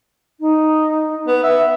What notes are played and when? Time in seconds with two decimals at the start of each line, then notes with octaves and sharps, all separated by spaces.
0.40 D#4
1.27 B3
1.43 E5 F#5